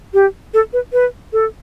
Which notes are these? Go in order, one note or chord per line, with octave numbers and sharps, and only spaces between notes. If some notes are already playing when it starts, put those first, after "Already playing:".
G4
A4
B4
B4
A4